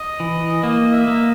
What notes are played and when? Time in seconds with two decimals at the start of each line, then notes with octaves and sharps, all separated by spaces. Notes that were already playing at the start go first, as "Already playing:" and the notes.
Already playing: D#5
0.20 E3
0.63 A#3 D#5
0.93 E5
1.08 A#3